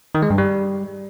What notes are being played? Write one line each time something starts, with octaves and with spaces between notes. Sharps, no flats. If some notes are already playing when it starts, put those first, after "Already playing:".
D#3
G#3
G2
G3